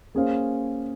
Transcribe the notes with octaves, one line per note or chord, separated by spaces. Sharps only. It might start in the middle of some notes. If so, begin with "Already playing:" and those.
A#3 C#4 G#4 C5 F5